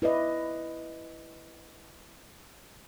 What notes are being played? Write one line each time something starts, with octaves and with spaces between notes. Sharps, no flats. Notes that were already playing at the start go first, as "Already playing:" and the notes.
E4 B4 D5 D#5